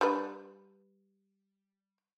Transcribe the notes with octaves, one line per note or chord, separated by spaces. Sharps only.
G3 D4 B4